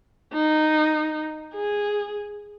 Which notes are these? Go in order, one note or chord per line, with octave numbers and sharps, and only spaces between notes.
D#4
G#4